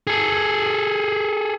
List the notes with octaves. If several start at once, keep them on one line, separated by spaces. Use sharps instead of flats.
G#4 A4